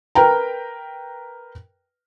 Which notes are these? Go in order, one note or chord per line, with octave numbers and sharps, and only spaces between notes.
A#4 B4 G5 A#5